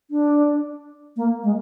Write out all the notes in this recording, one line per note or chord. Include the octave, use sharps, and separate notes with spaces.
D4
A#3
G#3